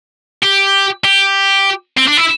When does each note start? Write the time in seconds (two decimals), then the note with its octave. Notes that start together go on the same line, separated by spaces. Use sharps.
0.43 G4
1.05 G4
1.97 C4
2.08 D4
2.17 E4